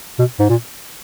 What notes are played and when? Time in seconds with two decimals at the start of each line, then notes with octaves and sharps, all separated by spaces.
0.19 B2
0.40 G#2
0.50 A#2